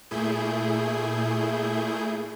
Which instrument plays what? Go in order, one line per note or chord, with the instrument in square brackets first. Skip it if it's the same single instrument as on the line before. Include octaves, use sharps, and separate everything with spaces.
[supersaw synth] A#2 A3 E4 G#4 G6